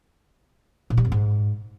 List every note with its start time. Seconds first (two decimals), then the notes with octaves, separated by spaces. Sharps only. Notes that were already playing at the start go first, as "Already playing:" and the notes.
0.90 A#2
0.97 G3
1.05 F2
1.12 G#2